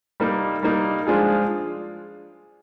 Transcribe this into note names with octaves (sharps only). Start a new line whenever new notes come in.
G3 A#3 D#4
G3 A#3 D#4
F3 G#3 D4 F4 G#4